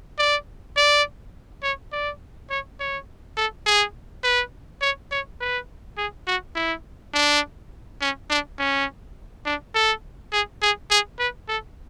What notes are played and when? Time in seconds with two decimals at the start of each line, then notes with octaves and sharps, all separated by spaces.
0.19 D5
0.77 D5
1.63 C#5
1.93 D5
2.50 C#5
2.80 C#5
3.37 A4
3.66 G#4
4.24 B4
4.82 C#5
5.11 C#5
5.41 B4
5.97 G#4
6.27 F#4
6.55 E4
7.14 D4
8.01 C#4
8.30 D4
8.59 C#4
9.46 D4
9.75 A4
10.32 G#4
10.62 G#4
10.91 G#4
11.19 B4
11.48 A4